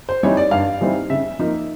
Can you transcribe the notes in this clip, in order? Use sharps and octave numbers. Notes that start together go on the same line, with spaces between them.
C5
E3 G3 C4 D#4 C#5
D5
G2 F5
E3 G3 C4 D#4
C#3 E5
F3 A#3 D#4